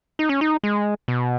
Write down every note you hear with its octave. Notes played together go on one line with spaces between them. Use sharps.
D#4
C#4
D#4
G#3
B2